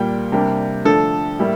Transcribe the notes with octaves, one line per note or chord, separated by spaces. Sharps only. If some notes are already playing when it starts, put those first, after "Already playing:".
Already playing: A#2 G3 A#3 G5
C3 G3 A#3 D4
D3 F3 A3 D4 A4
A2 G3 A#3 E4